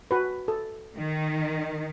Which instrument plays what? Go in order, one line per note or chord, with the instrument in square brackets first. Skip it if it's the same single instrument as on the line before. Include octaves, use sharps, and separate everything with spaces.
[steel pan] F#4 B4
A4
[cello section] D#3